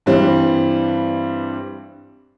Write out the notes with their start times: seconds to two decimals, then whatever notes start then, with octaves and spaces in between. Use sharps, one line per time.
0.06 G2 E3 G3 C4